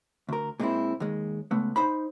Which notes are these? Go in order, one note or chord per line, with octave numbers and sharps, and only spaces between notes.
D2 A#4
A#2 G#3 C4 E4
D#2 G#3
C#2 A3 B3
D#4 C5 B5